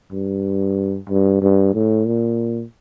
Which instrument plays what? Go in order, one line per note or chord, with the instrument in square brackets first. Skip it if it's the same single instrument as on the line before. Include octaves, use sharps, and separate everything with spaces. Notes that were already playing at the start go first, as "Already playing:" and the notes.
[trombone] G2
G2
G2
A2
A#2